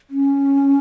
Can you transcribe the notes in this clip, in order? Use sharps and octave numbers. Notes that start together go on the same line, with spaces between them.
C#4